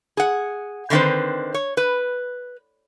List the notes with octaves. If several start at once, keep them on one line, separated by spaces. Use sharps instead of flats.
G#4 F#5
D3 D#3 A3 C4 B4 C5
C#5
B4